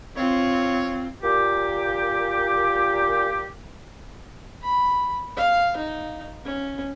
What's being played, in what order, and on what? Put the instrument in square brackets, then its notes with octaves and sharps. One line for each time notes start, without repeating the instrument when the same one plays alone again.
[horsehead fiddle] C4 [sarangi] F4 [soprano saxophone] C#5
[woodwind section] A#2 G4
[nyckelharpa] B5
F5
D#4
C#4